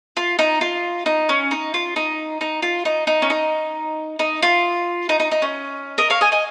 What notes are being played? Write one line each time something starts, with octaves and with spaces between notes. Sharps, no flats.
F4
D#4
F4
D#4
C#4
D#4
F4
D#4
D#4
F4
D#4
D#4
C#4
D#4
D#4
F4
D#4
D#4
D#4
C#4
A#4 D#5
C#5 F5
D#5 G#5
D#5 G#5